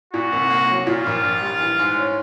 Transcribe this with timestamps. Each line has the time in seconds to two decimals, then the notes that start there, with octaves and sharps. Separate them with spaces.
0.13 A#2 F#4
0.32 C2
0.50 A#3
0.69 F#3
0.87 A#2 F4
1.06 A#1
1.23 A#1
1.42 G3
1.61 E3
1.79 G#2
1.97 C#4